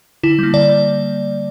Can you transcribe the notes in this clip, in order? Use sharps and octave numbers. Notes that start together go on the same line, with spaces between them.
D3 E4
G3 A#3
D3 D5